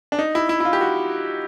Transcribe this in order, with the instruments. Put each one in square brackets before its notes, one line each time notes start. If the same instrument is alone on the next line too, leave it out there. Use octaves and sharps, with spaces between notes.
[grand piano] D4
D#4
E4
E4
E4
F4
G4
F#4